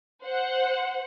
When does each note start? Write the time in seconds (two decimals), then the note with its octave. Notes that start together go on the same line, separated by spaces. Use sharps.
0.23 C5 F#5